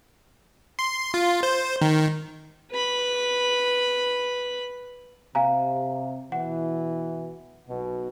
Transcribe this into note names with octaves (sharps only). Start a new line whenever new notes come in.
C6
F4
C5
D#3
B4 B5
C3 F5 G#5 A#5
B2 E3 F#5
B1 B2